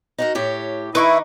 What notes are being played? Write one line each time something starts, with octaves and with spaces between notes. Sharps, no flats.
D#4 F#4 A#4
A2 G4 C#5
D#3 D#4 E4 B4 C#6 D6